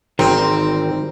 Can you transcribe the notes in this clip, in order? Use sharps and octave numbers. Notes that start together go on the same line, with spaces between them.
G#1 D#3 E3 G3 C4 A#5